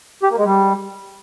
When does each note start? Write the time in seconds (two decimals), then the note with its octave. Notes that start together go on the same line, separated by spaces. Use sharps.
0.23 G4
0.30 A#3
0.38 G#3
0.45 G3